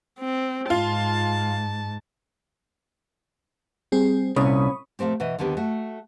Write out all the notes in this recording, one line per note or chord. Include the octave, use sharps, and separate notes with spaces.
C4
G#2 F4 A5
G3 C4 G#4
C2 A#2 C#4 B5 C#6 D#6
A#2 F3 A3 C4 G4
B2 E3 D#5
D#2 D3 D#3 B3 G4
A3 F#4